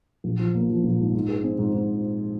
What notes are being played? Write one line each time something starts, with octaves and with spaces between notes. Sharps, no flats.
A#1
F3
A#3
F3
A#1
G#2
G#2
G#4
C4
G#2
G#2